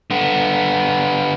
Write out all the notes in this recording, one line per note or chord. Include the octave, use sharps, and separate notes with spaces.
D3 B3